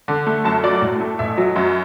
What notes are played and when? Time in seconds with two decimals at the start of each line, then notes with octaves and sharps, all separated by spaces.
0.08 D3
0.26 A3
0.45 F#2 A5
0.63 F#3 D5
0.82 A2
1.00 A3
1.19 A1 E5
1.37 F#3
1.56 F#2